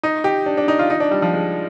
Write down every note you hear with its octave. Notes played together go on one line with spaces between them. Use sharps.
D#4
G4
D4
D4
D#4
F4
D#4
D4
G3
F3
G#3